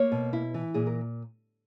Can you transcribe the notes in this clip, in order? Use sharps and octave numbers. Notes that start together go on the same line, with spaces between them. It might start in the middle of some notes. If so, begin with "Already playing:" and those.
Already playing: A#3 C#5
B2
E4
E3
A#2 G#4
A#4